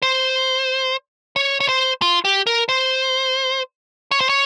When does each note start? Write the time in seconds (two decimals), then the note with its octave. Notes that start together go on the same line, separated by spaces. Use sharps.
0.02 C5
1.36 C#5
1.60 C#5
1.69 C5
2.02 F4
2.25 G4
2.47 A#4
2.69 C5
4.11 C#5
4.20 C5
4.29 C#5